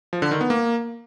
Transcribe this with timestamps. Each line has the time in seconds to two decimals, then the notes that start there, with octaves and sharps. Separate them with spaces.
0.13 F3
0.22 D3
0.31 D#3
0.41 B3
0.50 A#3